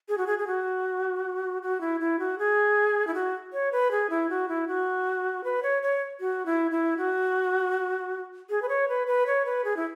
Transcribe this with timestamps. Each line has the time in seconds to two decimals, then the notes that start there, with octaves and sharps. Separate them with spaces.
0.09 G#4
0.18 F#4
0.27 G#4
0.39 G#4
0.47 F#4
1.62 F#4
1.81 E4
2.00 E4
2.19 F#4
2.39 G#4
3.07 E4
3.14 F#4
3.53 C#5
3.72 B4
3.91 G#4
4.10 E4
4.30 F#4
4.49 E4
4.68 F#4
5.44 B4
5.63 C#5
5.83 C#5
6.20 F#4
6.46 E4
6.71 E4
6.97 F#4
8.50 G#4
8.62 B4
8.69 C#5
8.88 B4
9.07 B4
9.27 C#5
9.46 B4
9.65 G#4
9.77 E4